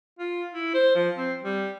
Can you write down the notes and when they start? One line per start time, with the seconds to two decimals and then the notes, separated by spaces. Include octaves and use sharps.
0.19 F4
0.53 E4
0.74 C5
0.95 F3
1.17 C4
1.43 G3